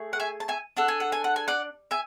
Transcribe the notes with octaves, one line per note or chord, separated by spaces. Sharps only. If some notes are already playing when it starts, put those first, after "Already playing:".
Already playing: A3 G#4
F#5
E5 G#5
A5
E5 G#5
D4 A4 F#5
G#5
F#5
G#5
F#5
G#5
D5 F#5
E5 G#5